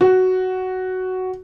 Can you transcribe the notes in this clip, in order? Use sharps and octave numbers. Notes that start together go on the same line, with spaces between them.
F#4